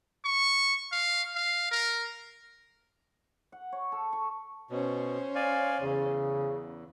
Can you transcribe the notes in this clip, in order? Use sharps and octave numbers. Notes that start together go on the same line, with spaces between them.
C#6
F5
F5
A#4
F#5
C#5
A4
C#6
B2 C#4 C5
D5 F5 G#5
E2 C#3